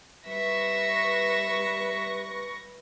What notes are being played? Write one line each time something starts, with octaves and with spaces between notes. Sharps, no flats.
G3 B4 E5 C#6 A#6